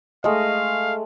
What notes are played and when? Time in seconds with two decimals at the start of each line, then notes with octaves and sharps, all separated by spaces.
0.24 G#3 A3 D#5 F5 E6